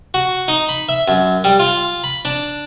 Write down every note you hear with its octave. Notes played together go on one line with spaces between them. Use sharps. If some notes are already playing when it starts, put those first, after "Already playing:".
F#4
D#4
B5
E5
F#2
G3
F4
B5
D4